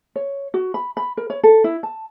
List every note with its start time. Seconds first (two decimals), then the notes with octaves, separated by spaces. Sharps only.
0.16 C#5
0.54 F#4
0.74 B5
0.97 B5
1.17 A#4
1.30 C#5
1.43 A4
1.64 E4
1.83 A5